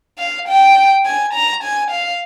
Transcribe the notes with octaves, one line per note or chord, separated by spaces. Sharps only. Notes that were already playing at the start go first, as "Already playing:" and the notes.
F5
G5
G#5
A#5
G#5
F5